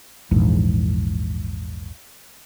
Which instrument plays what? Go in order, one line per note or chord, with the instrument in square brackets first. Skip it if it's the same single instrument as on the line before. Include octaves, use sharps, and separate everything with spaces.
[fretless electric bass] A#1 E2 G#2